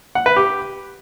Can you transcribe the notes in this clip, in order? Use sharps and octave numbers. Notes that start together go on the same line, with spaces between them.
F#5
B4
G4